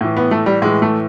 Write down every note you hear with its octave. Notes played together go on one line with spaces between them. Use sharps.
A2 E3
B3
A3
G3
A2 E3 G#3
A3